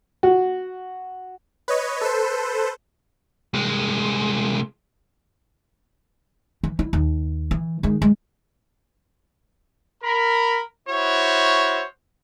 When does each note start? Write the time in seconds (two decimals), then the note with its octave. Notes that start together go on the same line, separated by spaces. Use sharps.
0.23 F#4
1.68 B4 C#5 D#5
2.01 A4 B4 C5
3.54 C2 G#3
6.63 E3
6.79 E4
6.93 D#2
7.51 E3
7.83 D#3 G#3
8.02 G#3
10.03 A#4 B5
10.88 E4 F#4 C5 C#5